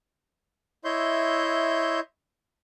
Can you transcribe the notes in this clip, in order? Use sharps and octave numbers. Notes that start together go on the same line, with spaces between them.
E4 C#5 D#5 E5 C6 G6